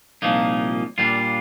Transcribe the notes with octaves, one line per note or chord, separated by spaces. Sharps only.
C2 A#2 F3 A#3 D#4
A#2 G3 D4 F4